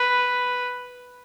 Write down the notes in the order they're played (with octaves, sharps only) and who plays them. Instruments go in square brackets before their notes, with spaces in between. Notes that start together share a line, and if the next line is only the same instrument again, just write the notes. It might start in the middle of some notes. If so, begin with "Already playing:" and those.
Already playing: [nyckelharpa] B4